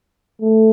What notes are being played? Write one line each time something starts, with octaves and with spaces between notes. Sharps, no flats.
A3